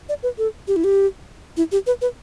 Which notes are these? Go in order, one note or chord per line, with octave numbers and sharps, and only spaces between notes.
D5
B4
A4
G4
E4
G4
E4
G4
B4
B4